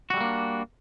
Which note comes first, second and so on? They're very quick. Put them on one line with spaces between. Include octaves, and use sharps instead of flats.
F#4 G3 A3 A#3 D4